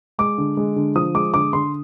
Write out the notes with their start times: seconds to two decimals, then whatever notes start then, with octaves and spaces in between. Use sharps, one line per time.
0.18 G#3 D6
0.38 D3
0.57 G#3
0.76 D3
0.95 F3 D#6
1.14 G#3 D6
1.34 D3 D6
1.53 D3 C6